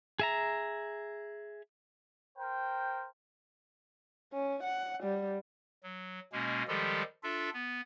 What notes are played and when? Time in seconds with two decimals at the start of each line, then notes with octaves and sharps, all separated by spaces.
0.19 G#4 E5 A#5
2.38 A#4 C5 G5
4.33 C#4
4.63 F#5
5.03 G3
5.83 F#3
6.33 B2 G#3 A#3 C#4
6.68 D#3 F3 G3 G#3 G4 A4
7.23 D4 F4 A4 E5
7.54 B3